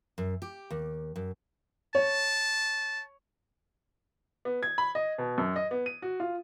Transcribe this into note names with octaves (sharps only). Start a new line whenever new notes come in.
F#2
G4
D#2
F#2
C#5 A5
B3
G#6
B5
D#5
B2
F#2
D#5
B3
D#7
F#4
F4